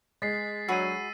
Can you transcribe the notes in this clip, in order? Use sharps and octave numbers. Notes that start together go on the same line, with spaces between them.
G#3 A6 B6 C7
D3 F#3 F#4 G#4 B5 E6 D#7